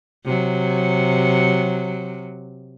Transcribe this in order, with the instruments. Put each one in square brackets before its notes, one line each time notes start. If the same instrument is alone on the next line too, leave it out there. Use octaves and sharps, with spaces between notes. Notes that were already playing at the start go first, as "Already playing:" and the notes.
[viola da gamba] C3 F#3